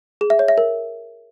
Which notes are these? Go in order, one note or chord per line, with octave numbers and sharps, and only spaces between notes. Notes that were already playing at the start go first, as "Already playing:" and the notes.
G#4
E5
C#5
E5
A#4